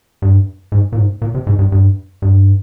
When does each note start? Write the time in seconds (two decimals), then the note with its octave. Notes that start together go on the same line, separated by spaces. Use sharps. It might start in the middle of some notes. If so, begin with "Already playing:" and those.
0.22 G2
0.72 G#2
0.92 A#2
0.97 G#2
1.22 A#2
1.35 C3
1.47 G#2
1.59 G2
1.72 G2
2.22 G2